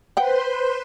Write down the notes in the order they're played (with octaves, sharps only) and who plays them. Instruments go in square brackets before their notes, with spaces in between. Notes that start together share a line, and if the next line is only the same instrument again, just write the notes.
[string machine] B4 C5 C6 [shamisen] F#5 G5